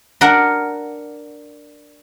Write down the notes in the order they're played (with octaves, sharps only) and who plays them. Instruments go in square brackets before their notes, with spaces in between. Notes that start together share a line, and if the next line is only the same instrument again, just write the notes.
[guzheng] D4 A#4 F#5